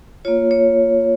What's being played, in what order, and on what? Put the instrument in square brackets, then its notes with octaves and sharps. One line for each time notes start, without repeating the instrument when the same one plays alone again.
[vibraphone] A#3 F4 C#5
C#5